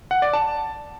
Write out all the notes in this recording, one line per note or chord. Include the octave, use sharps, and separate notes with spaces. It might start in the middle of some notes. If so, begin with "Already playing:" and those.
F#5
D5
A5